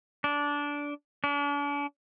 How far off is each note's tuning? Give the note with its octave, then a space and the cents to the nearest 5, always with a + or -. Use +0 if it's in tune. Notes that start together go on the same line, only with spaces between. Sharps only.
D4 -15
D4 -40